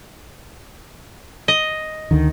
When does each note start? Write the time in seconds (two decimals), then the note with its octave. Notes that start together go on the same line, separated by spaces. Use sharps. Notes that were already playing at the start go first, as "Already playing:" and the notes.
1.48 D#5
2.11 D2 D3 D#3